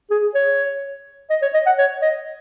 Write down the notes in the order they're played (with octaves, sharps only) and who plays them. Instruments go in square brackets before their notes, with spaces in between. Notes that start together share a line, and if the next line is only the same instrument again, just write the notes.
[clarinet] G#4
C#5
D#5
C#5
D#5
F#5
C#5
D#5